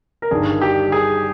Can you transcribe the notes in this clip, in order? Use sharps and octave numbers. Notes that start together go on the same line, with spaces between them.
A#4
G1 G2 D#3 G#4
G4
G#4